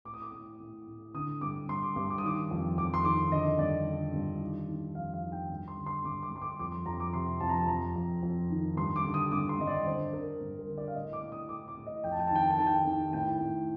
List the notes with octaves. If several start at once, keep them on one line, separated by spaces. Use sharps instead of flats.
A2 D6
D#6
D6
A2
A2
A2
D3 D#6
G2 D6
G2 C6
D6
G2 D6
D6
D#6
D#3 D6
F2
F2 D6
C6
D#3 D6
D3 D#5
G2 D5
D3
G2
D#3
D#3
F2 F5
F5
D#3
G5
G2
C6
D3
C6
G2 D6
D6
G2 C6
D6
F2 D6
C6
F2 A#5
D6
C3 C6
F2 A5
A#5
A5
F2 A#5
F2
F2
D#3
G2 C6
D6
D3
D#6
G2 D6
C6
G2 D#5
D5
D3 C5
D3 A#4
G2
A#4
D3
D5
F5
A2 D#5
D6
A2
D#6
A2 D6
D6
A2
D#5
F2 G5
A5
G5
A5
D#3 G5
A5
G5
D#3 A5
G5
D#3
A2 G5
A2